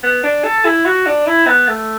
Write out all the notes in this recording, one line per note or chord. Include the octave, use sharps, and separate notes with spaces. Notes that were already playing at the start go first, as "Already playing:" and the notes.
B3
D4
A4
E4
F#4
D4
E4
B3
A3